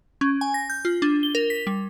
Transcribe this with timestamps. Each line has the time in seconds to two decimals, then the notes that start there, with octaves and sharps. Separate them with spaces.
0.21 C#4
0.41 G#5
0.54 A#6
0.70 G6
0.85 F4
1.02 D4
1.23 G7
1.35 A#4
1.50 B6
1.67 G3